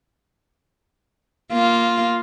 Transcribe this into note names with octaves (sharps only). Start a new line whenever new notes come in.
A#3 F4